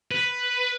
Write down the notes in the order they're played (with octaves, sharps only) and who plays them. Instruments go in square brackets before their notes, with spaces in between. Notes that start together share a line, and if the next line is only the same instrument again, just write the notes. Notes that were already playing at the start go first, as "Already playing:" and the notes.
[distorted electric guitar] B4